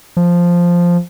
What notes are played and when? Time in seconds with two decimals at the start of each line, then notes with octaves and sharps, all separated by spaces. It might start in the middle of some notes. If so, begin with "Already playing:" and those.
0.17 F3